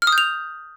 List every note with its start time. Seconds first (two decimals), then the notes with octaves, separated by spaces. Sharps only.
0.02 F6
0.07 D#6
0.12 G6
0.18 F7